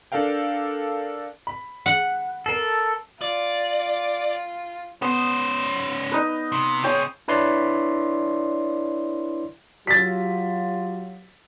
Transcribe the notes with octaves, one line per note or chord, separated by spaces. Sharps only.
D4 A4 A#4 F5 G5
B5
F#5
A4 A#4 C7
F4 D5
B3 C#4 C5
D#4 B4
C3
C3 G#4 C5 C#5 G5
D4 E4 B4 C#5 D5 C6
F#3 F4 G4 A6 B6